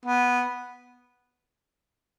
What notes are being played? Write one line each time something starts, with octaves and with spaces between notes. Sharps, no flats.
B3